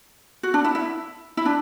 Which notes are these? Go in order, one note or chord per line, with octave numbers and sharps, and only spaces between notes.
F#4
D4
E4
E4
E4
D4